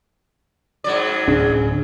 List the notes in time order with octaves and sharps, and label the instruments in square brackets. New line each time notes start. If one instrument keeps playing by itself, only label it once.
[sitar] G#2 F#3 D5
[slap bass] D1 C#4 D4 [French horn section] G#4